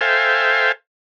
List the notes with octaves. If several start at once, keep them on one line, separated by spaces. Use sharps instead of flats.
A4 C5 E5 F5 G5 G#5